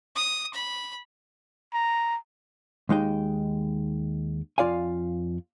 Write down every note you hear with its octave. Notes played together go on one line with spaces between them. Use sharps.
D#6
B5
A#5
D#2 G#3 D#4 G5
F2 F4 D5 F5 G#5